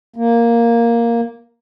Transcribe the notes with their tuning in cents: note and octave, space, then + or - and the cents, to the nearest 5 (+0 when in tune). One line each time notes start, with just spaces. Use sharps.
A#3 +0